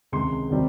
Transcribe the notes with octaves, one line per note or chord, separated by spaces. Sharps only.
C#2 C3 D#3 G#3 C6
C3 D#3 G3 C4